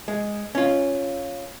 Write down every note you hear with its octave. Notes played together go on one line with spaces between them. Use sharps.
G#3
C#4 F4